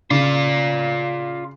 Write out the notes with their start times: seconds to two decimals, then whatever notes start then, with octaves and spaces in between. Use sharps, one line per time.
0.10 C#3 F4 D5